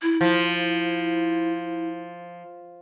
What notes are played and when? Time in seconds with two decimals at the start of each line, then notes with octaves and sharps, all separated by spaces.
0.02 E4
0.21 F3 E4